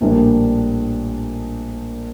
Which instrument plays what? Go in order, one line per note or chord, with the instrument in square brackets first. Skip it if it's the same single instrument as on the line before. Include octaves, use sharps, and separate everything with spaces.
[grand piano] A#1 A2 G3 A#3 D4